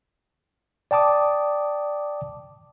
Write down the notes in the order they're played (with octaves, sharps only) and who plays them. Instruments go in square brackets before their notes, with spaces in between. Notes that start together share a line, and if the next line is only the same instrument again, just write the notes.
[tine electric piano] D5 G5 A5 D6 D#6